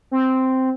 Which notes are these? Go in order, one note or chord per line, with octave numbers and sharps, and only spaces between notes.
C4